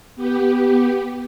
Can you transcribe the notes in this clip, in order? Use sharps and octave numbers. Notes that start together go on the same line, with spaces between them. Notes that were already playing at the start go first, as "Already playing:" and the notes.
B3 G4